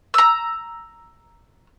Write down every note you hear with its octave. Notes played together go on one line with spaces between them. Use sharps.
A#5 E6